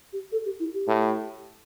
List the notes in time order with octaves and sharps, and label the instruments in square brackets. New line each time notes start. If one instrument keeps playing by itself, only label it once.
[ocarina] G4
A4
G4
E4
G4
[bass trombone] A2